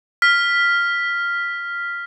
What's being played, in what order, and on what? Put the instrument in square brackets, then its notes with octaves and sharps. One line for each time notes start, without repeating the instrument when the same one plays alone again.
[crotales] F6 B6